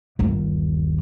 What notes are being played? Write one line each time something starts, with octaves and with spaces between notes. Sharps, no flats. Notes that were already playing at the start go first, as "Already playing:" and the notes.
G1 D#2